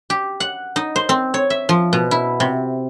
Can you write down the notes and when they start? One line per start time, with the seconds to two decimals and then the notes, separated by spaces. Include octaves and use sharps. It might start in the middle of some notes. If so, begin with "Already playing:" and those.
0.10 G4
0.40 F#5
0.76 D#4
0.96 C5
1.09 C4
1.34 C#5
1.50 E5
1.69 F3
1.93 B2
2.11 E4
2.40 C3